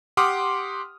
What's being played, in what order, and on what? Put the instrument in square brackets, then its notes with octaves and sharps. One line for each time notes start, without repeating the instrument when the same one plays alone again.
[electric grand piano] G4 F#5 C6 D6 D#6 F6